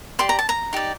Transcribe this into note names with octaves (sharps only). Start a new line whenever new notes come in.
G4 D5 C6
A#5
A5
A#5
D#4 G4 D5